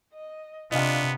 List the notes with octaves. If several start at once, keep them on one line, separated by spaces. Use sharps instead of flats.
D#5
C3 B3 D4 F4 D#5 F5